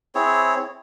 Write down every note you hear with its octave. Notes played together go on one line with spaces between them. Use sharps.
C4 E4 G#4 C#5